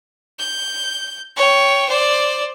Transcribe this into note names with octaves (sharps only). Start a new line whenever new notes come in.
G6
C#5 G5
C5 D5